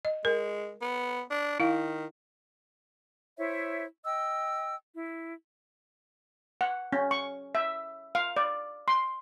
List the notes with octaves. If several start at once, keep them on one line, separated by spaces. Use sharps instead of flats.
D#5
G#3 A#4
B3
D4
D#3 E4 F5
E4 C5 C#5 E5
D#5 G5 E6
E4
F#5
C#4
C#6
E5
F5
D5
C6